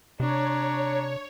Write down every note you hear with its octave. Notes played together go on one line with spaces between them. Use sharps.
C3 D4 C#5 A#5